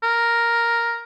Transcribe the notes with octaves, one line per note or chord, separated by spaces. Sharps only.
A#4